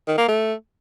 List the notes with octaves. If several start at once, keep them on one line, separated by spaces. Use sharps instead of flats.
D#3
A#3
A3